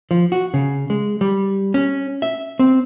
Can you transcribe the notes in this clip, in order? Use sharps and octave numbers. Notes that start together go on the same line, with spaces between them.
F3
F#4
C#3
G#3
G3
C#4
E5
C4